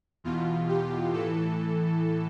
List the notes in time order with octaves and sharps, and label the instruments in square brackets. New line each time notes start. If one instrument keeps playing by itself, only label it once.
[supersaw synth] E2 B2 F4
G4
A2 E3 A4